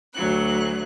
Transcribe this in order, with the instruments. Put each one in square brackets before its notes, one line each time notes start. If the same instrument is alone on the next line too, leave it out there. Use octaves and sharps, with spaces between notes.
[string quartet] D2 F#3 F#6